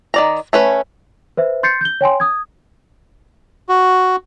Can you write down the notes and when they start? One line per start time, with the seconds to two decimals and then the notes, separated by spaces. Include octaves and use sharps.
0.14 D#3 D5 A#5
0.53 A3 C#4 B4
1.37 B4 C5 E5
1.63 C6 G6 A6 C7 C#7
1.81 G6 G7
2.01 C#5 G5 G#5 C6
2.20 D#6 G#6
3.69 F#4